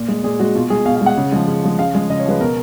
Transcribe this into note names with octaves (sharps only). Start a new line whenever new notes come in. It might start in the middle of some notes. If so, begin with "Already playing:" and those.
Already playing: A#2
G#3
A#2 G#4
G#3 F#4
B2 F4
G#3 G#4
B2 F5
F5
G#3 F#5
C#3
F3 G#3
C#3
F3 G#3
C#3 F5
F3 G#3
C#3 D#5
C#5
F3 G#3 B4
B2 A#4